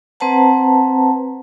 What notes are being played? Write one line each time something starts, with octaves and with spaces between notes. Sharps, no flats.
C4 B4 C5 F#5 A5 A#5